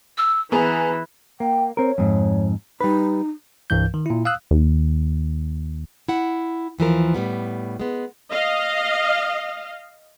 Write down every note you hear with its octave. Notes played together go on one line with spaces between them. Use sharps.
E6
E3 B3 G#4 A#5
A#3 G5
C4 A#4 C#5
F2 G#2
G3 D#4 B4
C2 G2 E3 G6
D#3
A#2 E4
F5 D#6 E6 F#6
D#2
E4 F#5
D#2 E3 F3 A#4
A2 G3 B3
G#3 B3
D#5 F5